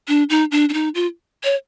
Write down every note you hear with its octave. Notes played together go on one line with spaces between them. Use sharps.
D4
D#4
D4
D4
D#4
F4
C#5